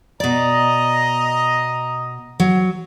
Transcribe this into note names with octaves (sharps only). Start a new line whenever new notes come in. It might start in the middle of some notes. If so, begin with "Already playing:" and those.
B2 D5 D#5 A#5
F#3